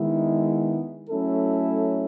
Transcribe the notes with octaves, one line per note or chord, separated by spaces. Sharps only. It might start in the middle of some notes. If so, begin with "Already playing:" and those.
Already playing: D#3 G#3 B3 E4
F#3 A3 C#4 E4 A4